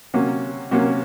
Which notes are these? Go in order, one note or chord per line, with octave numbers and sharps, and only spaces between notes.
C3 F#3 A#3 C#4
C3 F#3 A#3 C#4